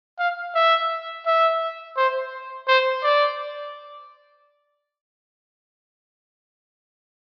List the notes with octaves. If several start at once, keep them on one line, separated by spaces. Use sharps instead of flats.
F5
E5
E5
C5
C5
D5